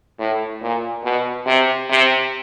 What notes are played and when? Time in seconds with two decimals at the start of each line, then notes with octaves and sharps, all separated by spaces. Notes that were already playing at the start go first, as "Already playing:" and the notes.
0.19 A2
0.61 A#2
1.04 B2
1.46 C3
1.90 C3